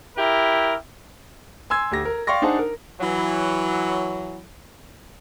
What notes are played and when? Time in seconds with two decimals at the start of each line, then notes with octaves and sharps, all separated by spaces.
0.17 E4 G4 A#4
1.70 G#5 C6 E6 G#6
1.91 D2 G4 A#6
2.05 A#4
2.27 D5 F5 G5 C6 C#6 A#6
2.42 D4 D#4 G#4 C5 F#5 A5
2.59 A#4
3.01 E3 F#3